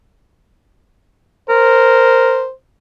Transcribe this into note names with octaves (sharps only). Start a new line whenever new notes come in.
A#4 C5